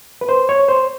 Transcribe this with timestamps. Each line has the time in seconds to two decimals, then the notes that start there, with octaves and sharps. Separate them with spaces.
0.21 B4
0.29 C5
0.49 C#5
0.68 C5